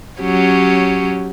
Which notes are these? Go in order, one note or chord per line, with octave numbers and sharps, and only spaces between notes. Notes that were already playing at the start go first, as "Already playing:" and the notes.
F#3 C#4 G4